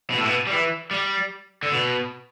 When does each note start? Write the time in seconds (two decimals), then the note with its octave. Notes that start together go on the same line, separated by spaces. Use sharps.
0.10 B2
0.18 A2
0.25 B2
0.47 G3
0.51 E3
0.91 G3
1.63 D3
1.71 B2